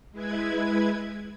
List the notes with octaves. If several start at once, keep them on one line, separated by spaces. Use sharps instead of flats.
G#3 E4 B4 G#6